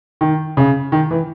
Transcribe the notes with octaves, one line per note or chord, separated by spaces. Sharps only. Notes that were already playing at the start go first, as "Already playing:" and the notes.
D#3
C#3
D#3
E3